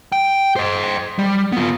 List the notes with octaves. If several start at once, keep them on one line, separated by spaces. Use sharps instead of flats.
G5
C5 D#5
G3
B3 F4